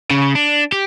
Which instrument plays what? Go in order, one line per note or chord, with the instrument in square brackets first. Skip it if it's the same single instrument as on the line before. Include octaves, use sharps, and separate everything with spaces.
[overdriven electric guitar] C#3
D4
G4